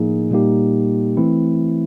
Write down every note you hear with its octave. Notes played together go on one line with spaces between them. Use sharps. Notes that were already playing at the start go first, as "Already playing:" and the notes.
Already playing: A2 F3 A#3 D#4 G#4
A#2 G3 A#3 D#4 G4
E3 A3 C4 E4